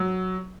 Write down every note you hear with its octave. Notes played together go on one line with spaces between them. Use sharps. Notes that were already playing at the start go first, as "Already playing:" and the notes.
Already playing: F#3